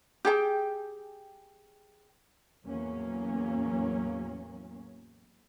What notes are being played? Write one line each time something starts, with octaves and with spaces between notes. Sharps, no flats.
G4 G#4 G5
E2 A2 F#3 A#3 C#4